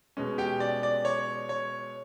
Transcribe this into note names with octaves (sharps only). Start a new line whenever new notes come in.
B2 G#3 C#4
G4 G5
D5
D5
C#5
C#5